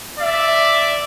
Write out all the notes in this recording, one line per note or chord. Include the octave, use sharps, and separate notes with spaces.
D5 E5